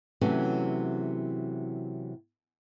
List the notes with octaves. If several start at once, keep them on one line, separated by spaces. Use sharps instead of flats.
C3 E3 F#3 A3 C#4